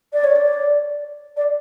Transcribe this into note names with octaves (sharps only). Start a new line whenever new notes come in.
D5
C#5
D5
D5